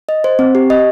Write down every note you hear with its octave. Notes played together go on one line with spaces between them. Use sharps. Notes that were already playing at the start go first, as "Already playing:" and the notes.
D#5
C5
C4
G4
D#5